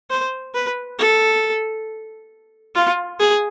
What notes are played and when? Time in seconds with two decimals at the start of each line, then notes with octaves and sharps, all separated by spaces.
0.10 C5
0.54 B4
0.99 A4
2.75 F4
3.20 G#4